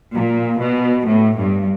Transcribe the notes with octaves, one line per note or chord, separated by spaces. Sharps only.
A#2
B2
A2
G2